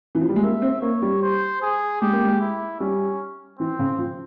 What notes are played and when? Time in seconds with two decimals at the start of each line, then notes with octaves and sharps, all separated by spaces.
0.15 E3
0.21 F3
0.29 G3
0.36 G#3
0.42 A#3 E5
0.62 C4
0.82 A#3 C#5
1.02 G3
1.22 C5
1.62 G#4
2.01 G#3 G4
2.13 A#3
2.25 G#3
2.40 E4
2.80 G3 C#4
3.59 E3 C4
3.79 C#3
3.98 F3